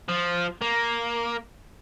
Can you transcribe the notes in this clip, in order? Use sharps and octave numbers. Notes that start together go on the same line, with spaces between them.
F3
A#3